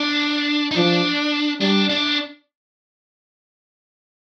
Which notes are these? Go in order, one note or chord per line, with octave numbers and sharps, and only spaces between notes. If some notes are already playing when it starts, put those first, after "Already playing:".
Already playing: D4
D#4
F3 D4
G3 D4
D4